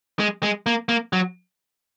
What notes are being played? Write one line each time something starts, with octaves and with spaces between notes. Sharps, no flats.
G#3
G#3
A#3
A#3
F#3